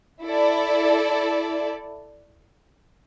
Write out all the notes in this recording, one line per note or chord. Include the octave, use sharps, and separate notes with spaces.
E4 A4 D5